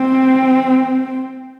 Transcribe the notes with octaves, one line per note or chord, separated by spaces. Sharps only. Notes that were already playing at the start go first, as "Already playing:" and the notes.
Already playing: C4